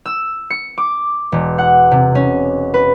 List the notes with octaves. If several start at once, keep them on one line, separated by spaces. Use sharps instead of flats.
E6
C#7
D6
E1
F#5
C3
C#4
B4